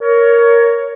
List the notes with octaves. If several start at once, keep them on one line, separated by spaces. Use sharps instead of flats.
A#4 C#5